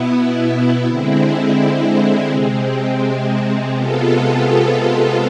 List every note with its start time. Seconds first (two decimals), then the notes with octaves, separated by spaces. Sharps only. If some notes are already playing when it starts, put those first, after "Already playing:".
Already playing: B2 B3 E4
0.85 D3 G#3 C4 E4
2.29 C3 G#3 C4
3.73 C3 G#3 B3 F4 A4